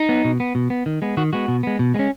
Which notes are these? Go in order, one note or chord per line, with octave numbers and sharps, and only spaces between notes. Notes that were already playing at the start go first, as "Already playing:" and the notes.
Already playing: D#4
B3
B2
B3
B2
B3
D#3
G#3 B3
D#3 F#4
G#3 B3 F#4
B2
G#3 B3
B2
G#3 B3 C#4